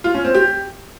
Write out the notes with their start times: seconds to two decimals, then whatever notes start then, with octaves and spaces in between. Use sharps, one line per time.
0.04 F4
0.14 C#4
0.24 C4
0.35 G4